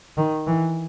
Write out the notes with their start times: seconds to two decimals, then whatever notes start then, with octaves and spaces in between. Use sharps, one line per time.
0.17 D#3
0.47 E3